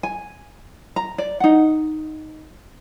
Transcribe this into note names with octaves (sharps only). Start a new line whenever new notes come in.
G#5
A#5
D5
D#4 F#5